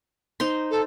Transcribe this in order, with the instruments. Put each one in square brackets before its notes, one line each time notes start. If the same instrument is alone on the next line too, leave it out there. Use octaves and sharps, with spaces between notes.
[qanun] D#4 C5 C6
[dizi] A4